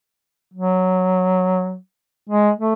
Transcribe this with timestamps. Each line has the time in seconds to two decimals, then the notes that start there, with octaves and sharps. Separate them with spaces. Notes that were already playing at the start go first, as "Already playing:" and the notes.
0.54 F#3
2.30 G#3
2.59 A3